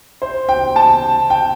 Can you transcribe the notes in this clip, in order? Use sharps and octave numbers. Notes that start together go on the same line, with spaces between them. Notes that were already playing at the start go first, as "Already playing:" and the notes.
C5
G5
A5
G5